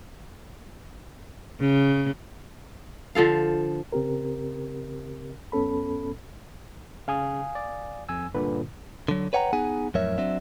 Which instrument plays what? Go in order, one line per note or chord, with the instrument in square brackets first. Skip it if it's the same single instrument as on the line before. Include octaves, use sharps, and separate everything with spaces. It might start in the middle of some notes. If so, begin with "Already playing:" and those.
[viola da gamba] C#3
[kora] D3 F3 A4 F5
[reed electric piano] C#3 C4 G4 A#4
F#2 B3 C#4 A4 B5
[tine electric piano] C#3 [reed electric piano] F5 G#5 D#6
[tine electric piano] D5
F2 G#5 E6
[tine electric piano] G2 A#2 D3 [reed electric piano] B4
[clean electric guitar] D3 F#3
B4 C#5 F#5 G5 A#5
B3 D#4 G#4 F#5 G#5
F2 A2 F#3 A#4 C#5 E5
F#3 C4 D4 E5